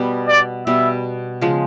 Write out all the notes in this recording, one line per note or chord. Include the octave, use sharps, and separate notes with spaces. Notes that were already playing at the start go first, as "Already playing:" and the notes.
Already playing: B2 G3 B3
D5
B2 G3 B3 E5
C#3 F3 G#3